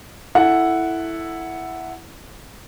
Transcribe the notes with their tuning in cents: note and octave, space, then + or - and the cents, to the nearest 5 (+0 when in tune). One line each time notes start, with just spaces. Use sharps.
E4 +0 A4 +0 F#5 +0